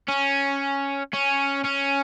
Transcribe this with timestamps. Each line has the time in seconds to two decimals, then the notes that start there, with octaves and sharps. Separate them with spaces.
0.09 C#4
1.13 C#4
1.65 C#4